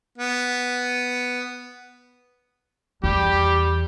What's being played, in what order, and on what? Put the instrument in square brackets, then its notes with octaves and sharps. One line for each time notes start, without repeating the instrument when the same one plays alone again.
[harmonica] B3
[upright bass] E2 [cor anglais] G3 [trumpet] G4